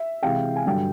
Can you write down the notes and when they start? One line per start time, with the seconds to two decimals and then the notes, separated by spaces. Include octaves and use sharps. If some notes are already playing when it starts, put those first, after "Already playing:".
Already playing: E5
0.23 C3 E3 G#3 F5 G5
0.56 G#5
0.66 G2 D3 F#3 G5